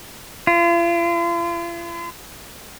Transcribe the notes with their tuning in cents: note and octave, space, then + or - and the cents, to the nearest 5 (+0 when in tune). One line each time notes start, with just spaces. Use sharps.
F4 -40